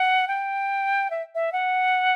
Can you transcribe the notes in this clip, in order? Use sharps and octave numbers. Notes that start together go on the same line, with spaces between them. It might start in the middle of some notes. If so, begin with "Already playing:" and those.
Already playing: F#5
G5
E5
E5
F#5